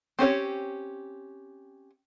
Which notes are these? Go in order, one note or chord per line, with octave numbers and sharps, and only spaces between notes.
C4 C#4 G4 C#5